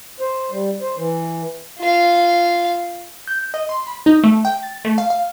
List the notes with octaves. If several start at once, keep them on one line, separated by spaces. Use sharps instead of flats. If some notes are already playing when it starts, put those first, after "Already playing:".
C5
G3
C5
E3
F4 F5
G6
D#5
C6
B5
D#4
A3
G5
A6
A3
F5
F5